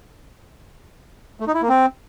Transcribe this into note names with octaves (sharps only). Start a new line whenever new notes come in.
A3
D#4
E4
A#3
C4